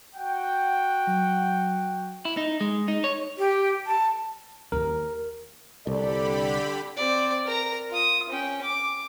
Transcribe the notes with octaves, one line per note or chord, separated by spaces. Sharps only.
F#4 F#5 G5
F#3
E4
D#4
G#3
D#4
C#5
G4
A5
D#2 A#4
C2 D3 G4 A4 D5 B5
C4 D5
A#4 A#5
F4 D#6
C#4 G5
D6